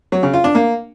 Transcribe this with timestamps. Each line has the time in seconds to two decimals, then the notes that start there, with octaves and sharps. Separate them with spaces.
0.12 F#3
0.23 C#3
0.33 F4
0.44 D4
0.55 A#3